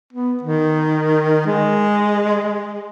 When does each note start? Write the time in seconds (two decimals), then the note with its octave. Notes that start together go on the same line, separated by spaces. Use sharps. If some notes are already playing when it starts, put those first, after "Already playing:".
0.13 B3
0.43 D#3
1.46 G#3